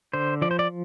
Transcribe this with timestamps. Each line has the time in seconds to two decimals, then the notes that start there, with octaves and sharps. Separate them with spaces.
0.13 D3 C5
0.42 F3 D5
0.51 C5
0.59 D5